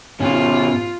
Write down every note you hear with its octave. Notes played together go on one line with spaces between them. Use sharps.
G#2 B2 C#4 F4